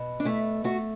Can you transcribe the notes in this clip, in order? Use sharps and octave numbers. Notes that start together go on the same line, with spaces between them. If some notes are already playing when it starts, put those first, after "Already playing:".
Already playing: B2
D4
A3 E4
A3 F#4